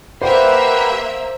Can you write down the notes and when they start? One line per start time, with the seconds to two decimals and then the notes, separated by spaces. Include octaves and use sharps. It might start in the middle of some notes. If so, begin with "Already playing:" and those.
0.22 A#3 G4 B4 C5 E5 F#5